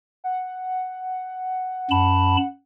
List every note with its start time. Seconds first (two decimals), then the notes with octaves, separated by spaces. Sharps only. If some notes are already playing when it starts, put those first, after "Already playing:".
0.24 F#5
1.91 F#2 A5 B5